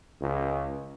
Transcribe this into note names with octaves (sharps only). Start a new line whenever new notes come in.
C#2